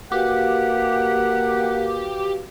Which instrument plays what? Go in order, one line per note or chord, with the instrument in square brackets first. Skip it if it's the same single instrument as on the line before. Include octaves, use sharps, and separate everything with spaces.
[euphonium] A#3 [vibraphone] F#4 B4 F5 [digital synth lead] G4 [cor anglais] F#5